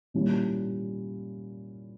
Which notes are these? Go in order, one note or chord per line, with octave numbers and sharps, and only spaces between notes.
A#2 G3 C#4 E4